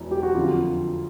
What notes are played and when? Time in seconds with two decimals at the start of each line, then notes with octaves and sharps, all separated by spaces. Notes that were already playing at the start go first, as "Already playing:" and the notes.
Already playing: E1 E2 F#3
0.11 G4
0.23 F#4
0.35 F2 D3 F#3 F4